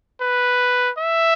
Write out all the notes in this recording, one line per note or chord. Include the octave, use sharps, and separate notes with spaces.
B4
E5